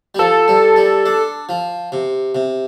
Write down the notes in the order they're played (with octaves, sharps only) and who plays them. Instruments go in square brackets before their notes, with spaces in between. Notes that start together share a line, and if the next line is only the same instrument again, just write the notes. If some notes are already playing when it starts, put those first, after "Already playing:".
[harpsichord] G3
[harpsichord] F3 [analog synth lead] A4
[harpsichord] G3
G3
D4
F3
C3
C3